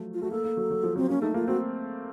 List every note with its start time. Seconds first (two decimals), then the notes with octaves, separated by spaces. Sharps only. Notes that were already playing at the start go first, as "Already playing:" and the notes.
Already playing: F3 F#3 A3
0.14 F4
0.22 A3 F#4
0.31 A#3 A4
0.44 A#3
0.57 F#3
0.70 F#3
0.83 F3
0.96 F#3 C4
1.09 A#3 C#4
1.22 A3 D#4
1.34 A#3 F4
1.48 C4 F#4